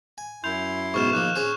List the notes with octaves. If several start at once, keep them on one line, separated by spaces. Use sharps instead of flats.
G#5
F#2 E4 C6 G6 F7
G#2 B2 C#6 F6 E7
A#1 D#3 A#3 F#6
C#4 G#4 C5